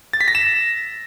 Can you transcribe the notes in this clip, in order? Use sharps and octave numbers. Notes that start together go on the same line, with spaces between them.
A6
B6
A#6
E7